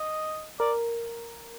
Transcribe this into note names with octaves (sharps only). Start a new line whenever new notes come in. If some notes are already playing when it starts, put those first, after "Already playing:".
Already playing: D#5
A#4 D5